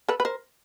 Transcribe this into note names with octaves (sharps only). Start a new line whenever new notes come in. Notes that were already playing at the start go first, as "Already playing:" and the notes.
A4 B4
B4
A#4 C5